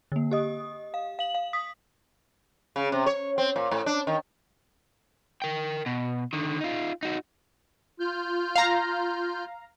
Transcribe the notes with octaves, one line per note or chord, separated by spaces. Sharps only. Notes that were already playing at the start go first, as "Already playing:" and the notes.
D3 A#3
G4 D#5 D#6
F5
F5 F#7
F5
D#6 B6
C#3
C3
C#5
C4
A#2
A2
D4
D#3
A#4 G5
B2
D3 D#3
D#4 F4
D#4 F#4
F4 F6 G6
F5 A#5